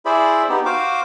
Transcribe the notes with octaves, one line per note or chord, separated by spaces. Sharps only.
E4 G#4 C5 D5 E5 B5
B3 D#4 G4
F#4 C5 F5 D6